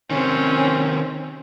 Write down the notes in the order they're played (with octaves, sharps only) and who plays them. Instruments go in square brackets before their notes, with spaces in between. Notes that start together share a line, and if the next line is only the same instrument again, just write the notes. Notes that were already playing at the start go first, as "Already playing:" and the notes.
[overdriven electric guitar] C3 D#3 [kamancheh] C4 C#4